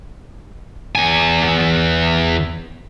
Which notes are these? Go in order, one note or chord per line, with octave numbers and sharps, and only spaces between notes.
E2 G#5